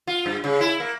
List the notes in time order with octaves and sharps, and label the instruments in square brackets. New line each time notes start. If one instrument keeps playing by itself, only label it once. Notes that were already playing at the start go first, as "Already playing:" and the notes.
[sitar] F4
G2
C#3
E4
A#3